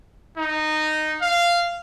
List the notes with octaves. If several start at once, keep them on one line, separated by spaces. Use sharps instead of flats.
D#4
F5